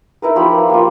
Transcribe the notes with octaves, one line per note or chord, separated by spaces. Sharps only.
D#4 E4 A#4 B4
F3 G4 B5
A#3 F4